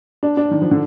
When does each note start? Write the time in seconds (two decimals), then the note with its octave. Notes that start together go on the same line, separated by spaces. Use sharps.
0.23 D4
0.37 D4
0.51 D#3
0.62 F3
0.71 D3